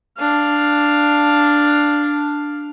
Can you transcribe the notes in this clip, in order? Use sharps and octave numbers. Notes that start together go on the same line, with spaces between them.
D4 F5